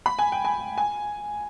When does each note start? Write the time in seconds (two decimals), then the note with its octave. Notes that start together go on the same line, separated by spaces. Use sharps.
0.06 B5
0.19 G#5
0.32 G5
0.45 G#5
0.78 G#5